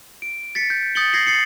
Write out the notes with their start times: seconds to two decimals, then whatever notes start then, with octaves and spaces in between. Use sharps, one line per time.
0.22 D7
0.55 A6 B6 C#7
0.70 G6
0.95 D#6 G6 A6 C#7 F#7 G7
1.13 G#6 A#6 C7 F#7
1.26 A6 C7 C#7 F#7